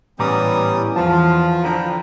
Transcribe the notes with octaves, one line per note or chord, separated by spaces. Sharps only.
A2 E3 G3 B3 C#4 A#5 D6 D#6
E2 F3 F4 F5 A5
D3 F3 G5 A#5 B5